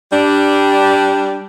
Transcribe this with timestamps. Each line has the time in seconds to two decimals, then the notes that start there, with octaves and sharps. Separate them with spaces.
0.11 G3 D4